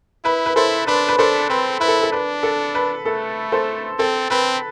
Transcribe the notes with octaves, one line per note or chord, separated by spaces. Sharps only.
E4 B4
B4
E4 A4 C5
D4 B4
B4
D4 A4 C5
C4 B4
E4 B4
A4
A4
D4 B4
A4
B4
A3 A4
A4 C5
C4 A4
C4 B4